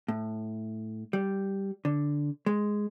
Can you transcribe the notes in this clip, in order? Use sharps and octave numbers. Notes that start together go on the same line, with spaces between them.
A2
G3
D3
G#3